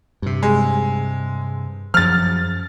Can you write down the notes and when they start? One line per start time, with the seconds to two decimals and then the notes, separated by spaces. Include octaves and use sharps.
0.22 G2 C3
0.43 G#3
1.94 F#2 F3 F6 A6